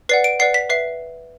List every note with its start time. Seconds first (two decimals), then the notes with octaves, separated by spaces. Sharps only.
0.09 B4 D5 F#5 C7
0.24 D7
0.40 B4 D5 F#5 C7
0.54 B6
0.70 B4 E5 C7